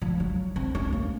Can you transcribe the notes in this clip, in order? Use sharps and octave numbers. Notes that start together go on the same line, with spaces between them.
F3
F#3
C4
C#4
A#3